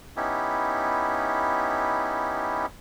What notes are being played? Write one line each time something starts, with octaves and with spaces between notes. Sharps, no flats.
B3 C#4 D#4 E4 G4